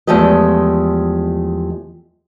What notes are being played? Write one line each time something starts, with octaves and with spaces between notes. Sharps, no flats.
E2 F3 G#3 A3 G4 D#5